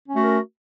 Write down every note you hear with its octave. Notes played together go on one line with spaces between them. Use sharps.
A3 C#4 F#4 A#4